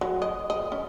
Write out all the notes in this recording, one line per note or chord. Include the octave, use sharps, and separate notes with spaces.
F#3
D#5
D#5
C#4